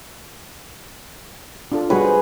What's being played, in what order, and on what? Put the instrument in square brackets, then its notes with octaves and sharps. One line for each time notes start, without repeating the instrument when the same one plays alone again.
[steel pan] D4 F4 A4
[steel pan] G3 F#4 C#5 [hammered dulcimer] G#4 B4
[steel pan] C5